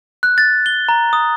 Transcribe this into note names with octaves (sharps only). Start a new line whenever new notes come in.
F#6
A6
G7
A#5
D#6